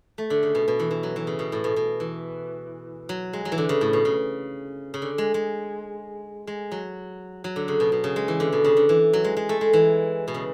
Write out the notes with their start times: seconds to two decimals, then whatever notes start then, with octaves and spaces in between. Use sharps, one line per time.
0.18 A3
0.30 D3
0.43 C#3
0.55 B2
0.68 B2
0.80 E3
0.91 E3
1.03 F#3
1.16 E3
1.27 C#3
1.39 B2
1.52 A2
1.64 B2
1.76 B2
2.00 E3
3.09 F#3
3.33 G#3
3.45 F#3
3.52 E3
3.58 D3
3.69 C#3
3.81 A2
3.93 B2
4.05 C#3
4.94 C#3
5.02 D3
5.18 G#3
5.34 G#3
6.47 G#3
6.72 F#3
7.44 F#3
7.56 D3
7.68 C#3
7.80 B2
7.92 B2
8.04 C#3
8.16 G#3
8.28 E3
8.40 D3
8.53 B2
8.64 C#3
8.77 D3
8.89 E3
9.13 F#3
9.24 G#3
9.37 G#3
9.49 A3
9.61 G#3
9.73 E3
10.28 B2
10.34 C#3